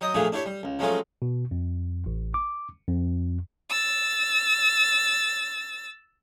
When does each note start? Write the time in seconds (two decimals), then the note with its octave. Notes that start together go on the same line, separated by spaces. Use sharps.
0.01 F#3 D#5 G5 D#6
0.14 A#2 F3 A3 D4 G#4
0.32 D4 E4 G4 C#5
0.46 G3
0.63 C#2
0.79 F3 F#3 G#3 A3 C#4 F4
1.22 B2
1.51 F2
2.06 A1
2.34 D6
2.89 F2
3.69 E6 A6